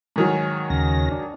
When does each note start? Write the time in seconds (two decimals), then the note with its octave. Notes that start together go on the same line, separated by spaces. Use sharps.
0.16 G#2 D#3 F#3
0.70 D#2 C#3 A#6
1.12 D4